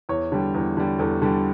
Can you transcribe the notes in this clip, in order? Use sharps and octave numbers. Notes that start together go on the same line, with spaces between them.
E2 C#5
D3 G3
E2
D3 G3
E2 A4
D3 G3